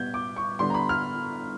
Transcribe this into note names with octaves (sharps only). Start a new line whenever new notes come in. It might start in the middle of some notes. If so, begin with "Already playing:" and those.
Already playing: B2 G3 B3 G6 G#6
D6
C#6
D3 G3 B3 C6
A#5
B5
F6